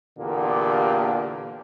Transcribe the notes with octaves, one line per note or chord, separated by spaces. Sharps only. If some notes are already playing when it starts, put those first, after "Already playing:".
E2 A#2 D3 A#3 G4